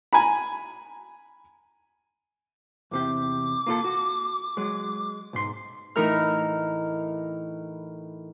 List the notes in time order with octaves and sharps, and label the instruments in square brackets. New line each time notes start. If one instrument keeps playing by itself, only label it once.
[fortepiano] G#5 A#5 B5
[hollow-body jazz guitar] E2 C3 G4 [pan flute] D6
[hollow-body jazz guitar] A#3 F4 A4
F#4
F#3 G#3
B1 G#2 C6
[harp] A2 E3 D#4 A#4 E5 F6